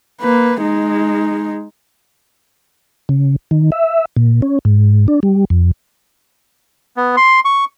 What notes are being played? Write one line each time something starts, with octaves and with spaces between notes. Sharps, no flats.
A#3 B4
G#3 D#4
C#3
D#3
E5
A#2
C#4
G#2
D4
G3
F2
B3
C6
C#6